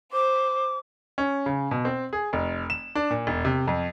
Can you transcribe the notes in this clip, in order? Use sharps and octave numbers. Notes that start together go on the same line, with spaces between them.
C5 D6
C#4
C#3
B2
C4
G#4
F1
E7
D4
A#2
E1
C3
F2